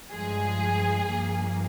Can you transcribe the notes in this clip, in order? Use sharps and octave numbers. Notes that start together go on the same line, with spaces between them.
G2 F3 G#3 G#4
G2 F3 A#3